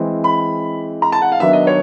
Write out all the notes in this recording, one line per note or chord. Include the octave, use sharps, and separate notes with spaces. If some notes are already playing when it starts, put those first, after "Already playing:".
Already playing: E3 G#3 C4
B5
A#5
A5
F#5
F5
D#3 F#3 B3 D4 E5
D#5
C#5